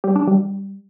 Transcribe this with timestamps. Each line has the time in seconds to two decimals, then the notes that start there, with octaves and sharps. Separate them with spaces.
0.04 G3
0.16 D4
0.27 G3